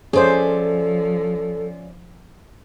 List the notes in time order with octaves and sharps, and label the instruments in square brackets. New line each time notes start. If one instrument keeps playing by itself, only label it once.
[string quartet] F3 [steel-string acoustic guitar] C#4 D5 E5 [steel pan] G#4 C5 [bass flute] A4